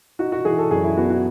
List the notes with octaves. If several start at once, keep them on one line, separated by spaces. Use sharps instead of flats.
D#4 F#4
F#4
E3 G#4
A4
F#2 G#4
E4
B3 F#4
F#4